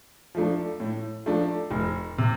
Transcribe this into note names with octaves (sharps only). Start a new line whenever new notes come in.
F3 A3 D4
A2
F3 A3 D4
F1
C3